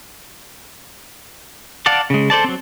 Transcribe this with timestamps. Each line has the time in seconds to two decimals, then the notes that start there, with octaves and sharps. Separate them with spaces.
1.86 D5 F5 F#5 A5 D6
2.10 C#3 G#3
2.30 A4 C5 D5 A5
2.44 F#3 C4